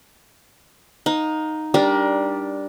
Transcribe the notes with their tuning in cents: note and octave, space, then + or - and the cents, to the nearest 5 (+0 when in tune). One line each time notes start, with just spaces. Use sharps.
D#4 +0 F5 +35
G3 +0 D4 -5 A#4 +20